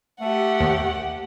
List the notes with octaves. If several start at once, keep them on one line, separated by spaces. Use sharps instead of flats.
A3 G4 F#5
D#2